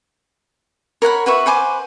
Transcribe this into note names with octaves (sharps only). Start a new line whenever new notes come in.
A#4 C#5 F#5 B5
F#4 B4 E5 C#6
B4 C5 G#5 D6